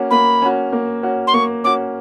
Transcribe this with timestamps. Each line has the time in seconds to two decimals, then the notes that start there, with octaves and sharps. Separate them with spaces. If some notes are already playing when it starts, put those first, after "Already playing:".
Already playing: A#3 C#4 F#4
0.11 A#3 B5
0.42 C#4 F#4
0.73 A#3
1.03 C#4 F#4
1.27 C6
1.34 A#3 C#6
1.64 C#4 F#4 D6